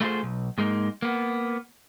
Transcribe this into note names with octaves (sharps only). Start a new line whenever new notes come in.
A3 E4 F4 G4 G#4 C5
B1
G#2 G#3 A#3 D#4
A#3 B3